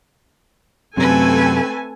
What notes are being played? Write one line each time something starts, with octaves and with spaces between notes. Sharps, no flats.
F#2 C3 A3 C4 A4 B4 G#5